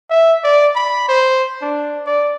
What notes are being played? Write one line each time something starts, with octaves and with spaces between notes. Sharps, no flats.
E5
D5
B5
C5
D4
D5